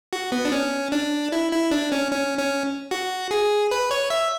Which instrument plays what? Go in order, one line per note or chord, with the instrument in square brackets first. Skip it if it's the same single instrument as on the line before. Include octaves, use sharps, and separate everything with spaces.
[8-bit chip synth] F#4
B3
D4
C#4
D4
E4
E4
D4
C#4
C#4
C#4
F#4
G#4
B4
C#5
E5